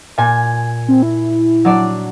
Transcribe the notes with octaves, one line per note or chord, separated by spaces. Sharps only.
A#2 G#5
C4
E4
F#3 D4 D5